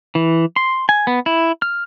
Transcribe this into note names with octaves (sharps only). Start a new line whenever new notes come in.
E3
C6
G#5
B3
E4
F6